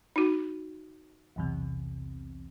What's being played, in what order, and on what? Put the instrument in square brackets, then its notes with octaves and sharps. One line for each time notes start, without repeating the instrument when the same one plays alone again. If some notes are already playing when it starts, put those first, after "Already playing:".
[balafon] D#4 F#4
[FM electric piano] B1 E2 C3